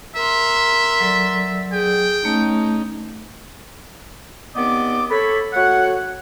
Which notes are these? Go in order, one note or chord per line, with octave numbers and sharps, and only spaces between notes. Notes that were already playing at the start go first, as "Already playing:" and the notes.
A#4 E5 C6
F#3 A4 D5
G#4 G5
A3 C#4 D#4
D#2 B3 C4 D5 D#5 D6
A4 C#5 B5
A3 F#4 C#5 F#5